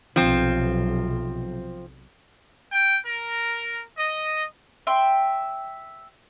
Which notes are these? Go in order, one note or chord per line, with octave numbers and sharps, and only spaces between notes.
B1 C3 F3 C4
G5
A#4
D#5
E5 G5 C6